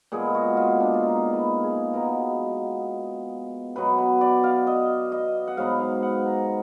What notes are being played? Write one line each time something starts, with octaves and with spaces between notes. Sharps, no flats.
A#2 G#3 B3 G#4
F#4
F4
D4
F4
D#4
B4
G#4
B2 G#3 B3 A#4
B2 F#3 B3 B4
B4
D5
F5
D#5
D#5
F#5
G#2 F#3 B3 F5
F5
F#5
A#5